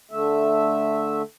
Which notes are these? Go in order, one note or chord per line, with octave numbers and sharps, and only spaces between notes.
D3 A3 E5